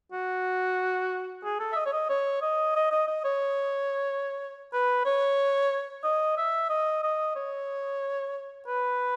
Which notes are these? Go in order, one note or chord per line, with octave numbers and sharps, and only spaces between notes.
F#4
G#4
A4
E5
D#5
C#5
D#5
C#5
D#5
D#5
D#5
D#5
C#5
B4
C#5
D#5
E5
D#5
D#5
C#5
B4